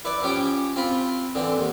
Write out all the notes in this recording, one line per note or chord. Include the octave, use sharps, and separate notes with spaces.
E4 B4 D5
F3 C#4 G4 G5
C4 F4 B5
D3 E3 C4
D#2